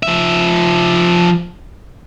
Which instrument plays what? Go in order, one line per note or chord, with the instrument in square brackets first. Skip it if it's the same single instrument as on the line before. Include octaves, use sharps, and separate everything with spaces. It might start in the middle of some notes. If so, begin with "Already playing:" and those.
[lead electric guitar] F3 E5